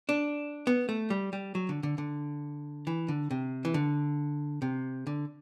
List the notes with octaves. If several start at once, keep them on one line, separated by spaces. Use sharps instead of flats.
D4
B3
A3
G3
G3
F#3
D3
D3
D3
E3
D3
C3
E3
D3
C3
D3